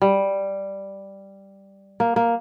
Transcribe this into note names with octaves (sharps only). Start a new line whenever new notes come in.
G3
A#3
A#3